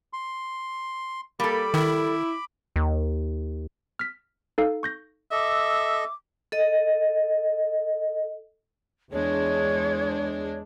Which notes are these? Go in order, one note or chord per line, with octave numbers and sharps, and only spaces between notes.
C6
G3 A#3 A4 B5 D6
D#3 E4
D#2
F6 B6
D#4 A4 F5
C#6 G6 A#6
A4 D#5 E5 D6
A4 D#5
E2 G#3 D4 C#5